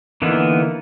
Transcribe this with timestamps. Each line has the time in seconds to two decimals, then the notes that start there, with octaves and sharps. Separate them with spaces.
0.22 D3 E3 A#3 B3 D#4